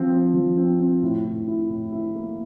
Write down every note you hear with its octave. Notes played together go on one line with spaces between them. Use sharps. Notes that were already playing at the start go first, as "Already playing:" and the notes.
Already playing: F3 C4
C4
F3
C4
C4
A2
A2
E4
A2
E4
A#3